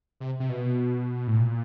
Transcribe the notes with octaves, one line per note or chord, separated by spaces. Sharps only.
C3
C3
B2
A2
A#2